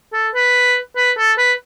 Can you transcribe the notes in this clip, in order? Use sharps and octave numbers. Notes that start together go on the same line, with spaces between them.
A4
B4
B4
A4
B4